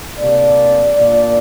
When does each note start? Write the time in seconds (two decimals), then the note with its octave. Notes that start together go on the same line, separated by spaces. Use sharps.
0.19 C3 A#3 D4 D5
0.97 A#2 A#3 D4